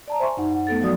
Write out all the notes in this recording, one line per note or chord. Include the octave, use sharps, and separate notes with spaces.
D5 A5 A#5
C5 E5 G#5 C6 C#6
F#2 D#4 F#5
F#5
A3 B3 A4 A6
F3 F#3 F#4 D5 D#6